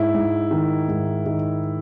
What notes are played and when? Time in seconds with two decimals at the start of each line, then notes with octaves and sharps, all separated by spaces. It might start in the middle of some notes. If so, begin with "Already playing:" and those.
Already playing: G#2 E4
0.14 G#2
0.51 D#3
0.89 G#2
1.26 D#3